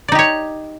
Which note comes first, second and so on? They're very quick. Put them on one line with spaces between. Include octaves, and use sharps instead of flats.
D5 D#4 G4 C#5